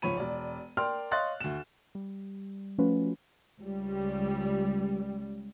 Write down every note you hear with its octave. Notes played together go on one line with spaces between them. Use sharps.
C#2 G#2 F3 C#5 B5 D#7
E1 D5
A#4 D5 G5 C6 F6
C#5 D#5 F5 C6 F#6 A6
D2 E7
G3
F3 A3 C#4 F4 F#4 B4
C#2 G3